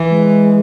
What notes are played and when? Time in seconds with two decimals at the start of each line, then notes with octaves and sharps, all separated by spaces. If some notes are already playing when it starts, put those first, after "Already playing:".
Already playing: E3
0.09 G#3